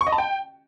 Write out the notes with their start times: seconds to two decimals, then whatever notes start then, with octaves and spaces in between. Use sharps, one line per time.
0.01 C#6
0.07 D#5
0.12 A5
0.18 G5